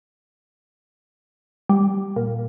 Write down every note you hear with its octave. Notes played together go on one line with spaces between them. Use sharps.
G3
A#2